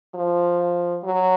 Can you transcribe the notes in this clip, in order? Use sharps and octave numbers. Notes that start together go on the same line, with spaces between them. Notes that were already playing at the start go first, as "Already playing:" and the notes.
F3
F#3